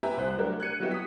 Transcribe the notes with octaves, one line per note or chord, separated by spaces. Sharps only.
G4 B4 E5 G#5 A#5
C2 C5 F#6
F#3 A3 D4 G4 A#4
F#6 G#6 C#7 D#7
F#3 B3 E4 F#4 G4 D#5
D#6 B6